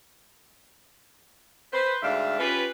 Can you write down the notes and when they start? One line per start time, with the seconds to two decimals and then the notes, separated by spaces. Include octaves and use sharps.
1.73 B4 C5
2.02 D2 G#2 D3 D4 E5 F5
2.39 C#4 F4 G4 B4